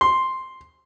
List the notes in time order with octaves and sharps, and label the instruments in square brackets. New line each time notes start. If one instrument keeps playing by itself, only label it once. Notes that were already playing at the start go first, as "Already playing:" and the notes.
[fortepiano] C6